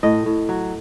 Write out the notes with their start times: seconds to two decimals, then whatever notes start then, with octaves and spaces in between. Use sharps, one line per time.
0.03 A2 D#5
0.26 A2
0.49 F#3